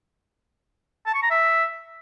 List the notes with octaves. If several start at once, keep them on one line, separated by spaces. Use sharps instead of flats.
A5
C#6
A#5
E5